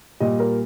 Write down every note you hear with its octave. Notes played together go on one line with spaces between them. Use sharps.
A#2 G3 D#5
A#4